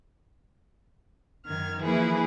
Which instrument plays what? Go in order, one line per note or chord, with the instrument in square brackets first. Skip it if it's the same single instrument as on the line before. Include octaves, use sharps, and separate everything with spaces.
[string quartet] F#2 D#3 F6 G#6
E3 F3 A#3 E4 G#4 B4